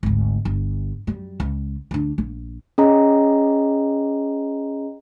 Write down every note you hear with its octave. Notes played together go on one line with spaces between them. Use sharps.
G#1 D2
G1
F#2 G3
C#2
D2 D4
A#1
C#4 G#4 D#5 A#5